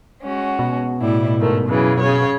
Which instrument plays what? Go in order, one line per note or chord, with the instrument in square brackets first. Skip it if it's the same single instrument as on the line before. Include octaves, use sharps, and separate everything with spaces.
[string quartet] G#3 C#4 F#4
[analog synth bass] B2
[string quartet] A2 G3 E4
G#2 D#3 A3
F#2 C#3 E3
C#3 C#5